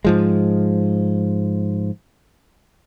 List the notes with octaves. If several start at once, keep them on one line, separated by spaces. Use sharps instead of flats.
G#2 F3 G#3